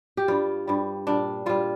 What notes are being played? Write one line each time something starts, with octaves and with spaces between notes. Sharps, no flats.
G4
G2 G3 F4
G2 G3
A#2 G3 D4
A#2 G3 F4